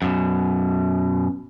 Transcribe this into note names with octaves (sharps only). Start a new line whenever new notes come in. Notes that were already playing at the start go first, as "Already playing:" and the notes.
F#2 B2